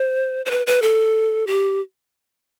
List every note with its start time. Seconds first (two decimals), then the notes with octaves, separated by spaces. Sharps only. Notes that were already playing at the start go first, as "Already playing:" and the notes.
Already playing: C5
0.46 C5
0.51 B4
0.67 B4
0.82 A4
1.47 G4